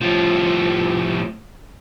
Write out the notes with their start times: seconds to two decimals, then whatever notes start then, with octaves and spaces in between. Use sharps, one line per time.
0.02 A2 F3